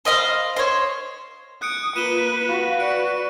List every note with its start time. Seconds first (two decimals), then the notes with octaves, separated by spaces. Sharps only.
0.05 C5 D#5 F5 B5
0.56 C5 C#5
1.62 D#6 F#6 C#7 D7
1.96 A#3 F4 B4 D#7 E7 G7
2.48 F#4 F5
2.80 B4 D5 D7